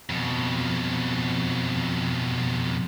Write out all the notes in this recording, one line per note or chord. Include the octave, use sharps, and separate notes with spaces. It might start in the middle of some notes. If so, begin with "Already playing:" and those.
F2 B2